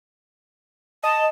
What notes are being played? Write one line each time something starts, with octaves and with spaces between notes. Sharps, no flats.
D#5 A5